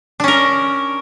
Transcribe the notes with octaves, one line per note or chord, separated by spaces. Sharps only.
C#4 D4 A#4